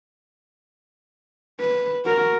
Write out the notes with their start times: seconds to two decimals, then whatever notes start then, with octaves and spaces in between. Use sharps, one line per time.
1.60 B4
2.05 F#4 A#4